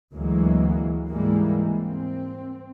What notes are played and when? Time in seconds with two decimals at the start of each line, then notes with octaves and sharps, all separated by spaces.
0.13 D2 E3 F#3 G#3 A#3
1.09 G#2 E3 G3 G#3 A#3
1.77 C4